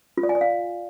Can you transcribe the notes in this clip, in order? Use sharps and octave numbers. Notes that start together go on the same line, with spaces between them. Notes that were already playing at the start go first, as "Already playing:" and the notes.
F4
D5
G#5
D5
F5